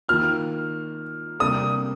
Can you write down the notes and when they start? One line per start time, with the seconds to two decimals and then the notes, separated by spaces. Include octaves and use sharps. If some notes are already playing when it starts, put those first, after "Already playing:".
0.08 D#3 A#3 F4 F6
1.39 C3 G3 A#3 D4 A4 D#6